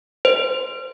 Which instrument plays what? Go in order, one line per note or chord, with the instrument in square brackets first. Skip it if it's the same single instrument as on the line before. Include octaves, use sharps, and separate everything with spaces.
[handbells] C5